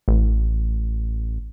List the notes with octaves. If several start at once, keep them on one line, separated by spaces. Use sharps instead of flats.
A1